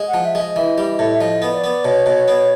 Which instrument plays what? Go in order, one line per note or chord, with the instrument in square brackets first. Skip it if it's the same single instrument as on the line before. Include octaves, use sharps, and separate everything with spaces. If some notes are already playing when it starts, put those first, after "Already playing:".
Already playing: [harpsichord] G#3
[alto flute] F#5
[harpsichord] F3
[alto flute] E5
[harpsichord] G#3
[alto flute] D#5
[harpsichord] E3
G3
A2
[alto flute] E5
[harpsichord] F3 [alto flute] D#5
[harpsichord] B3
[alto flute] D5
[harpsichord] B3
[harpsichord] B2 [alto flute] C#5
[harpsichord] B2
B3